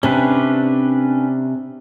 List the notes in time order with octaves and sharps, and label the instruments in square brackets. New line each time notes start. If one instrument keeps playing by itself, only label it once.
[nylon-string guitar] C3 [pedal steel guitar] C#4 D4 B4